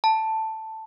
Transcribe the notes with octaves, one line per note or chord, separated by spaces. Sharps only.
A5